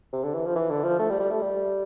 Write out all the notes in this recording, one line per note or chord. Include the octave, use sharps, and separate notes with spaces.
C3
D3
E3
F3
E3
D3
F3
A3
G3
G3
A3
G3